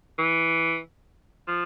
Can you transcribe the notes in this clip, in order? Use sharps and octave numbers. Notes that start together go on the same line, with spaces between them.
E3
F3